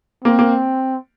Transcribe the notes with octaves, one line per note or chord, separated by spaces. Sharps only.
A#3 C4
A#3